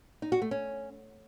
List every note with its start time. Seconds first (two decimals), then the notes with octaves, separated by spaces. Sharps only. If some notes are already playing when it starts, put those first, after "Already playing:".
0.22 D#4
0.32 F#4
0.42 A3
0.51 C#4